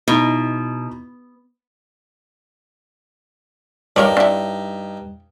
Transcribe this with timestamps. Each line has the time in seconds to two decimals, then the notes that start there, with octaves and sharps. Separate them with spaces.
0.08 B2 D#4 E4 B5
3.96 G2 D#4 A#4 C#5 D5
4.17 D4 E4